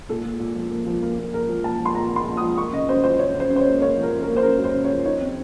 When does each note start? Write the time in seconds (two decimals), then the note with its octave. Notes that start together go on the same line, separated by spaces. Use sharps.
0.09 A#2 A4
0.25 A#2
0.40 A#2
0.56 F3
0.71 A#3
0.86 F3
1.02 A#3
1.18 A#3
1.33 A#2 A#4
1.49 F3
1.64 A#2 A5
1.80 F3
1.86 C6
1.95 A#2 A#5
2.11 A#3
2.16 C6
2.26 A#2
2.37 D#6
2.42 F3
2.58 A#3 C#6
2.73 C#3 D#5
2.89 F#2 C5
3.04 F3 C5
3.19 C#3 C#5
3.35 C#3
3.40 C5
3.50 F#2
3.56 C5
3.61 C#5
3.66 A#3
3.81 A#3 C#5
3.97 F3
4.03 A#4
4.12 C#3
4.23 A#4
4.28 A#3
4.37 C5
4.43 F#2 A#4
4.58 F#2
4.64 C5
4.74 C#3
4.84 C#5
4.90 F3
5.05 D#4 C#5
5.21 C4